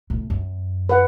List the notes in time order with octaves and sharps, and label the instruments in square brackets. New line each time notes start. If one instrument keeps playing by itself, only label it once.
[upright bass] A2
F#2
[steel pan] B4 F#5